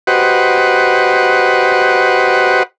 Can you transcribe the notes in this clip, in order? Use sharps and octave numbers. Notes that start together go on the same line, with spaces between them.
F#4 G4 B4 C5 D#5 F#5